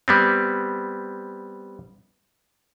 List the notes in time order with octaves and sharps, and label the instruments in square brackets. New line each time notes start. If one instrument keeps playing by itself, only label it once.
[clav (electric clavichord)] G3 B3 C4